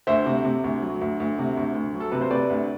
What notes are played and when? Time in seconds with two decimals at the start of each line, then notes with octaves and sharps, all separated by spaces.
0.07 D2 C5 E5
0.26 C3
0.45 C3
0.64 D2
0.82 F#3
1.01 D2
1.20 D2
1.39 C3
1.57 D2
1.75 D2
1.94 F#3
2.00 A4
2.12 C3 B4
2.21 C5
2.31 C3 B4 D5
2.50 D2